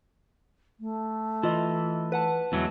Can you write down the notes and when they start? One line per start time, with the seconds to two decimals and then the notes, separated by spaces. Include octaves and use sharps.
0.80 A3
1.43 E3 F4 D#5
2.12 B4 F#5 A5
2.52 E2 E3 F#3 G#3